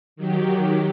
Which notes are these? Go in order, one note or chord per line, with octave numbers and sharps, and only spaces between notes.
D#3 F#3 G4